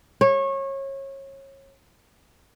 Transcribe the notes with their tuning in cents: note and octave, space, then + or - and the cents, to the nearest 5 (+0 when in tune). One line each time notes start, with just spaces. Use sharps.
C#5 -25